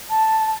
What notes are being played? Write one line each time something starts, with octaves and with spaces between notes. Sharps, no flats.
A5